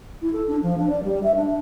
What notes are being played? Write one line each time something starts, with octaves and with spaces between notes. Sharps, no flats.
E4
A4
D4
F3
D4
D5
G3
E5
D4